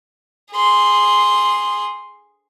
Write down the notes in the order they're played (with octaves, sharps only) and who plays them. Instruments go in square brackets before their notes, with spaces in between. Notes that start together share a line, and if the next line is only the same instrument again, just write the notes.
[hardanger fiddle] G#4 C6